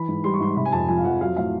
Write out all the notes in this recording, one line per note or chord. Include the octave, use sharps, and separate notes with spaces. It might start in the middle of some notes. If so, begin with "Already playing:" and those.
Already playing: E3 B5
G#2
G3 C6
C#6
G#2 C6
C3 B5
G#5
F2 A5
F3 G#5
F5
F2 F#5
F#3 F5
A2 F5